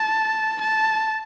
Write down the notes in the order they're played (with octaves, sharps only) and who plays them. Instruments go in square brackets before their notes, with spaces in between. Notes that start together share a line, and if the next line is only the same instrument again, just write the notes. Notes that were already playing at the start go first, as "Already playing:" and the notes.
Already playing: [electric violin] A5
A5